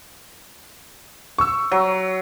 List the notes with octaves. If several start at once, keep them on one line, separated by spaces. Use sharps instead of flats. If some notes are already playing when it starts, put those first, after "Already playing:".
C#6 E6
F#3